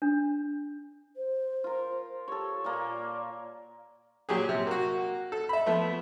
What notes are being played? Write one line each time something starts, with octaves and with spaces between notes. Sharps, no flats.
D4
C5
F4 A#4
G4 A4 C#5
A#2 A#3 D5
A#2 F#3 G4 G#4
C3
A#3 F#4
A4
E5 B5
F3 A3 B3